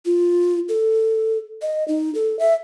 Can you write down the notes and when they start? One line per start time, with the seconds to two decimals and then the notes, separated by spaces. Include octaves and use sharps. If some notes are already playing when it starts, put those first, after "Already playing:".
0.05 F4
0.69 A4
1.62 D#5
1.88 D#4
2.15 A4
2.39 E5